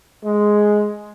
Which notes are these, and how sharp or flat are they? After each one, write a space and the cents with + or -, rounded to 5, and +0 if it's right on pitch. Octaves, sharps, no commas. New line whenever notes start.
G#3 +5